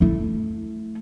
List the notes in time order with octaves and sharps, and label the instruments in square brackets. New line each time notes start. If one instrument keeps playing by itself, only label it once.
[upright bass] A3 E4